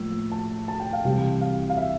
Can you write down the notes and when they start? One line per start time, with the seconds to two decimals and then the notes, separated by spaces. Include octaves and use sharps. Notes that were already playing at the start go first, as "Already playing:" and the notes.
Already playing: A2 F3 A#3 E6
0.32 A5
0.68 A5
0.80 G5
0.93 F5
1.04 C2 C3 E3 G3 G5
1.41 F5
1.70 F5
1.77 E5